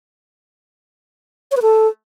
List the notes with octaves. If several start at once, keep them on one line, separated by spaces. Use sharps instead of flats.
C#5
B4
A4